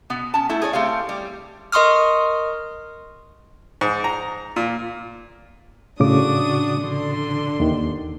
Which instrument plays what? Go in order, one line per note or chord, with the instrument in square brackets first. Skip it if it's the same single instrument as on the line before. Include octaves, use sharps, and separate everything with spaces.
[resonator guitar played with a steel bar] B2 B3
C#4 A5
A3 E4 A4
G#4 A#4 C#5 D5
A3 C4 G4 F5
G3
[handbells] A#4 D#5 C6 C#6 D#6 F6
[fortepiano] G#2
A#5
A#2
[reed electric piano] A2 C#3 D6 [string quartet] D4 F#4 D#6
[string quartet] D3 D4 C6
[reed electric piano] D#2 D#3